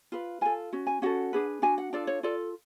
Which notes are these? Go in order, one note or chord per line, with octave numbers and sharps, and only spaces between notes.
F4 B4
F4 A4 G#5
C#4 F#4
G#5
C#4 F#4 A4 F#5
D4 G#4 B4
D4 F#4 G#5
F#5
D4 F4 A4 D5
C#5
F4 A4 D5